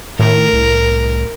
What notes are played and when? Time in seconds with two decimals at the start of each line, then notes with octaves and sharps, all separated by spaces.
0.19 A2 D#3 A#4
0.53 C2